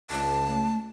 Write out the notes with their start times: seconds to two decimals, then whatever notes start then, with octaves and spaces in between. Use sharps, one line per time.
0.11 C#2 A5
0.46 A3